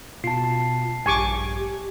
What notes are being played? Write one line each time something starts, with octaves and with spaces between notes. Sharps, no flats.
B2 F4 A5 C7
A#1 G2 G4 G#5 C#6 D6